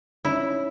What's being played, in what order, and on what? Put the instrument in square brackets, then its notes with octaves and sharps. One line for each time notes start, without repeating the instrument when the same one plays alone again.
[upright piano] C#4 D#4 [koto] E4